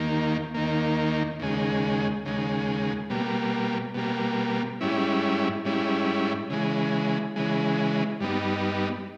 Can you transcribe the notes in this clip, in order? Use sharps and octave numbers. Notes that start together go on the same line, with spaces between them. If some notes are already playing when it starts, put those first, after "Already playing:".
Already playing: D#2 D#3 A#3
D#2 D#3 A#3
D#2 C#3 G#3
D#2 C#3 G#3
B2 G3 A#3
B2 G3 A#3
G#2 G3 C#4 E4
G#2 G3 C#4 E4
C#3 E3 G#3
C#3 E3 G#3
G2 G3 B3 D#4